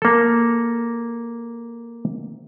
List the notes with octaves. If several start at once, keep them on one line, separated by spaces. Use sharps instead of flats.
A#3 A4